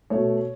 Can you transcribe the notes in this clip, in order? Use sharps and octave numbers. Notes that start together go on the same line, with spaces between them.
B2 A3 C#5